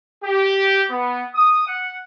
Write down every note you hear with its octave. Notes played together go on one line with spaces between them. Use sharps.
G4
B3
D#6
F#5